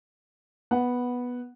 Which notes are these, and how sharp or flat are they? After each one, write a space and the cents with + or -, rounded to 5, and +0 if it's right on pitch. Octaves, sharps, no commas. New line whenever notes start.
B3 -5 F#5 +0